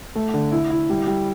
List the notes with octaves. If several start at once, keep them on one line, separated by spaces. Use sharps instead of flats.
A3
D3
E4
E4
G3
G3